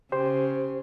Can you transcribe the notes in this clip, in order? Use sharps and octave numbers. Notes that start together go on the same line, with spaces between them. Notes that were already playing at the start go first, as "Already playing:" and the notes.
C#3 G4 C5